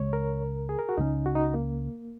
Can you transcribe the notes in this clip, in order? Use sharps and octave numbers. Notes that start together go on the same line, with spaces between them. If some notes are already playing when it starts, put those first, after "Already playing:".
Already playing: C#2 C#3 G#3 C#5
A#4
G#4
A#4
F#4
C#2 C#3 F#3 C#4 D#4
F#4
D#4
A#3